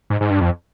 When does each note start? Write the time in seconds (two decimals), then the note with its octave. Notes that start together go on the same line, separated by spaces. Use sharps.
0.10 G#2
0.21 G#2
0.30 G2
0.41 F2